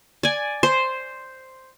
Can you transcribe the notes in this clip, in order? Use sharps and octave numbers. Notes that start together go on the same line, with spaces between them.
D5 G#5
C5